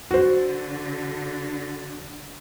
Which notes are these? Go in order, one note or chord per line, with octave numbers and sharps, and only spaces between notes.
D3 F#4 C5